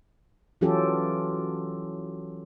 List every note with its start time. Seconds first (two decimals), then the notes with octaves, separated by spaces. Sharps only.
0.61 E3 F#3 C#4 F4 G4 A4